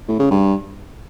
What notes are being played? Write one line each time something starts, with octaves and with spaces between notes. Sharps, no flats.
A2
C#3
G2